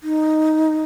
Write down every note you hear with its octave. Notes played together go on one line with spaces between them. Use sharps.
D#4